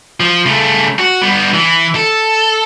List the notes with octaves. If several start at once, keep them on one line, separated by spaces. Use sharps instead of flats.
F3
C#3 A3
F#4
G3 B3
E3
A4